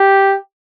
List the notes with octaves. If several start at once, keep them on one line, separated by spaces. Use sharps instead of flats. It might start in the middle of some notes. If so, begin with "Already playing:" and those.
Already playing: G4